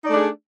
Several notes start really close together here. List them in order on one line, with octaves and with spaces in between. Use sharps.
D#4 D5 A3 D4 G#4